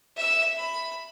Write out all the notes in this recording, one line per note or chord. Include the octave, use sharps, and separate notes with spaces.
E5 E6
B5